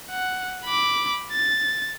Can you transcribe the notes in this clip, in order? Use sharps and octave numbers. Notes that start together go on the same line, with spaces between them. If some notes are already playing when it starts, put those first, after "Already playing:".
F#5
B5 D6
A6